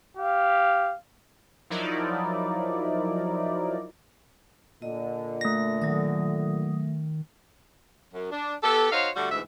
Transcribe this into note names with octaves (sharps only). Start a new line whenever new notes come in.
G4 F5
F3 F#3 D#4 E4 A#4 D5
A#2 D3 D#5
A3 A#6
D#3 F#3 D#6
F#2
D4
B3 G4 A4
D#4 F#4 C5 C#5 F5
D3 G3 A3 F#4
D2 G#2 E3 E5